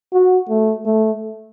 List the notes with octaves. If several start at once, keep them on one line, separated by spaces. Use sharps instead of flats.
F#4
A3
A3